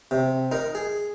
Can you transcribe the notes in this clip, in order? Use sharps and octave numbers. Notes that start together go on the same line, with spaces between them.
C3
D#4 A#4
G#4